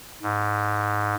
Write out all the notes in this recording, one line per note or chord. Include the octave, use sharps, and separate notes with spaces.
G#2